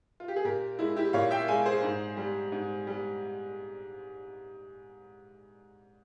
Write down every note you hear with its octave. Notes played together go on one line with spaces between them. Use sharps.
F4
G4
G#4
A#2 G4 A#4
G#3 E4
E4 G4
A#2 C#5 F5
E5 G5
G#3 F5 G#5
G#4 C5
G#2
G3
G#2
G3